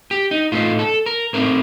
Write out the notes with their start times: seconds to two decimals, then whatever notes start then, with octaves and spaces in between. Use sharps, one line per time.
0.11 G4
0.31 D#4
0.52 A2 A3 C4 D#4 F4
0.79 A4
1.06 A#4
1.33 A2 A3 C4 D#4 A#4